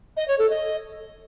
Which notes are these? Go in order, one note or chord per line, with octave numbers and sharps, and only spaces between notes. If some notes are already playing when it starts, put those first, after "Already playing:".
D#5
C#5
A4
D#5